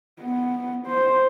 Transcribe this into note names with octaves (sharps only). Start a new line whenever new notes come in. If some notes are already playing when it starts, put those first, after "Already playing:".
B3
C5